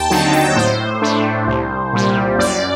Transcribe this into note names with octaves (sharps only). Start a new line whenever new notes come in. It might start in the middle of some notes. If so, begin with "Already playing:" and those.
Already playing: D#2 G5 A5
D3 F#3 C4 D#4 G5
G5
A2 C5
A3 D4
C2
A#2 G3
F#2 D5